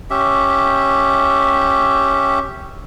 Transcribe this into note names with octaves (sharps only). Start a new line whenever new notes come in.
C#4 G4 E5